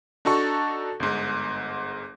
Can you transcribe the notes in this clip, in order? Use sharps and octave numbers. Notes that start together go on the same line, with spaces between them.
D4 D#4 F#4 A4 A5 C#6
G1 G#2